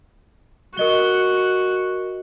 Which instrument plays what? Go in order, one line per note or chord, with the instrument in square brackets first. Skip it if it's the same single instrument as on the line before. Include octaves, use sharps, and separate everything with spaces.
[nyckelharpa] F#4 [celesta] A#4 D#5 G7